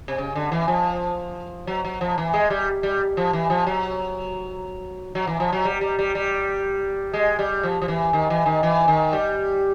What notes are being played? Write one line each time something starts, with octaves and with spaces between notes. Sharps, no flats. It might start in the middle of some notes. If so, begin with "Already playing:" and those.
C3
C#3
D3
E3
F3
F#3
F#3
F3
E3
G#3
G3
G3
F3
E3
F3
F#3
F#3
E3
F3
F#3
G3
G3
G3
G3
G#3
G3
F3
F3
E3
D#3
E3
D#3
E3
D#3
G3